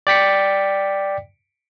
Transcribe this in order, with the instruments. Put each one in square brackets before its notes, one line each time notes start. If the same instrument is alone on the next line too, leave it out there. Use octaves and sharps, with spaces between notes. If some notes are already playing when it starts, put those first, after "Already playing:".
[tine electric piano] D5 G5 B6 C#7